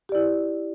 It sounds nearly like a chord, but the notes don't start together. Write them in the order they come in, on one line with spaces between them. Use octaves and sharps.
G4 D5 E4